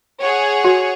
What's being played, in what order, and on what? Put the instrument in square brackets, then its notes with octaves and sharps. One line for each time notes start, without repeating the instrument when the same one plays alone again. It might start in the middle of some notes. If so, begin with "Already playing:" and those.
[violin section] G#4 C#5 F#5
[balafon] F#4